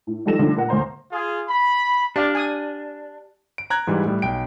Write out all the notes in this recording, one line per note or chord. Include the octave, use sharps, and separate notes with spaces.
A2
D#3 F3 G3 A4 A#6 E7
D3 F3 G3 A3
A#2 A#4 F#5
D2 A#3 C5 A#5
F4 G#4
B5
D4 G4 D5 F5
G#5 D#6
D7
A#5 F#6 G#6
G#2 E3 G3
A2 G3
B1 G5 D7